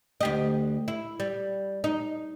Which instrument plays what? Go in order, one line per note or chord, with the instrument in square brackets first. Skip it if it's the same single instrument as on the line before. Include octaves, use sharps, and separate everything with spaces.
[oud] D2 G4 D#5
E4
G3
D#4